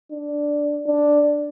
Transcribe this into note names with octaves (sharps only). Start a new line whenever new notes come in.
D4
D4